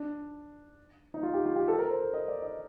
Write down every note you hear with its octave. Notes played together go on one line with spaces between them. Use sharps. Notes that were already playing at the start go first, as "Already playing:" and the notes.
Already playing: D4
D#4
F4
G4
F4
G4
A4
A#4
C5
D#5
D5
D#5